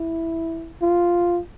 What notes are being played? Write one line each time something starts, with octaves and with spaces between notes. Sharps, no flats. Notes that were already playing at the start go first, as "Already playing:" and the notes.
Already playing: E4
F4